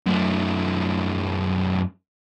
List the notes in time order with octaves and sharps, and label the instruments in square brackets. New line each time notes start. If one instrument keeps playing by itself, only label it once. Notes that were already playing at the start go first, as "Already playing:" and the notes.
[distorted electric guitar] F#2 A3